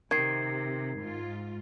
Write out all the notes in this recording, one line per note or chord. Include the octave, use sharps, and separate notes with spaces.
C3 D#3 G#6 C7
G#2 F4